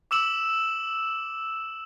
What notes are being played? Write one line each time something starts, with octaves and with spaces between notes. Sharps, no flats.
D6 E6 E7 F#7